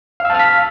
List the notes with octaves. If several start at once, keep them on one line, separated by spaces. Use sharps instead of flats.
F5 A5 E6 F6 B6